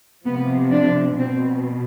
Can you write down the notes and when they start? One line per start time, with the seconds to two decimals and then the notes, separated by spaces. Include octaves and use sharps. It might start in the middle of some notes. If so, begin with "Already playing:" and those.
0.24 C3 F3 B3
0.71 D4
1.17 B2 C4